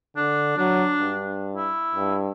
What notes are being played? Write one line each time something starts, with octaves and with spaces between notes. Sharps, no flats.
D3 D4
F#3 D4
G2
E4
G2